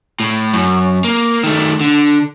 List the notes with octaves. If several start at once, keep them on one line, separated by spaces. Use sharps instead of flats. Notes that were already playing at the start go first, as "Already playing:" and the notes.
A2
F#2
A#3
D#3 A3
D3